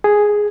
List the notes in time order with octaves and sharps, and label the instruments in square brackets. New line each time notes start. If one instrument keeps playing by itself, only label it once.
[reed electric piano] G#4